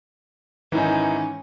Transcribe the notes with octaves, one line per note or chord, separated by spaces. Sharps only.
G#2 D#3 E3 C#4 D#4